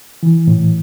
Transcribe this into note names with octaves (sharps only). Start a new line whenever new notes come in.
E3
A2